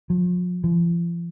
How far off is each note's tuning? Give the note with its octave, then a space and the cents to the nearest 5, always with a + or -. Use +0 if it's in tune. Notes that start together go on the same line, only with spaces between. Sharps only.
F3 +40
F3 -40